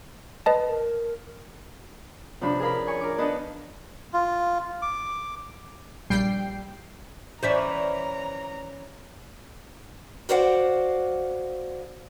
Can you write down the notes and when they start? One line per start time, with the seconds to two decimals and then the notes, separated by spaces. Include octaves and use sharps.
0.46 B4 D#5 A5
0.68 A#4
2.41 C3 F3 C#4 D4 B4 B5
2.60 G#4 A#4 F5 B5
2.87 C#5 G#5 C#6
3.01 A#4 D6
3.18 B3 D4 D#4 B4 D#5 A5
4.13 F4
4.82 D6
6.10 A#1 G3 G5 C7
7.43 E3 C#4 B4 C5 D5 E5 A#5
10.29 F#4 A#4 C5 D5 F5 F#5